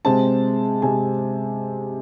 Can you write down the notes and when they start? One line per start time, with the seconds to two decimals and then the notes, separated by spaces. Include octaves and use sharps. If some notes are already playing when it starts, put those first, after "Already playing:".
0.05 C3 G#3 C4 A5
0.82 C3 G#3 C4 G#5